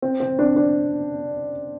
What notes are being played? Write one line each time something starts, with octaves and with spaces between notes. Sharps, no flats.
C4
C4
D4
D4